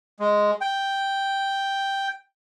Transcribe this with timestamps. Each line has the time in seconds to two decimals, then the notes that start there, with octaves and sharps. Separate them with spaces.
0.20 G#3
0.61 G5